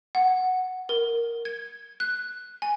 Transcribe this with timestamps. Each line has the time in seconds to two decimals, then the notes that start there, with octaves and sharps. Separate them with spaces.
0.15 F#5
0.89 A#4
1.45 G#6
2.00 F#6
2.62 G#5